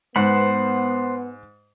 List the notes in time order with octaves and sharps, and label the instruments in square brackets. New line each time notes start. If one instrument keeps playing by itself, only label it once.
[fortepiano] G#2 [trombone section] B3 [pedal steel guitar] C5 F#5 B5